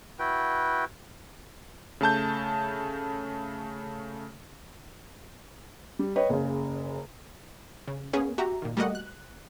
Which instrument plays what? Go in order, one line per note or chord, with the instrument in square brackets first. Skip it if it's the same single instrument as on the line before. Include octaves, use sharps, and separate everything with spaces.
[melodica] E4 F#4 B4 G5
[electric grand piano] C#3 A3 A5 G6
[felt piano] G3
B4 C#5 D#5 G5
F#1 C#3
[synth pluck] C#3
A#3 B3 C#4 G#4
F#4 G4 E5 A#5
A#2 D#3
G3 A3 A#3 F#4 D#5 F#5
F#6